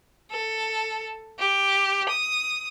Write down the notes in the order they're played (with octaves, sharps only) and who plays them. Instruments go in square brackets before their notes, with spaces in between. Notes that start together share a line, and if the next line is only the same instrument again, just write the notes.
[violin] A4
G4
D#6